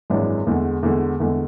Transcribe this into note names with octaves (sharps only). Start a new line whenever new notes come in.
G#1 F#2 E3 G#3 D4
E2 D3 G#3
E2 D3 G#3
E2 D3 G#3